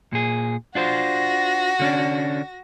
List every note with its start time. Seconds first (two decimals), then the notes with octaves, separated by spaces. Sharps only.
0.13 A#2 G#4
0.75 D4 F4 F#4 C5 A#6
1.80 D3 C#4 D4